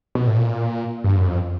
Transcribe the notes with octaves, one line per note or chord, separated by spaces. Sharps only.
B2
A2
A#2
G2
F#2
F2